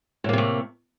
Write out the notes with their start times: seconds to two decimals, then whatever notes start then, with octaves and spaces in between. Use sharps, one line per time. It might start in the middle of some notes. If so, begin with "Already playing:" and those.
0.24 A2
0.29 A#3
0.33 C3
0.38 A3